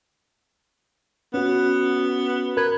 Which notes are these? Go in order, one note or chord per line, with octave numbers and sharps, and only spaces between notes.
B3 C#4 F#4
A#4 B4 G#6